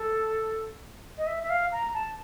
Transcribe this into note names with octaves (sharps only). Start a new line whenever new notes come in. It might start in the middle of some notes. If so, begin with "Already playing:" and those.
Already playing: A4
D#5
E5
E5
F5
A#5
A5